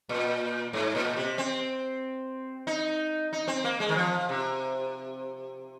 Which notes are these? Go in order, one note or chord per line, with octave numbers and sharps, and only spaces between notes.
A#2
G#2
A#2
C3
C4
D#4
D#4
C4
A#3
G#3
D#3
F3
C3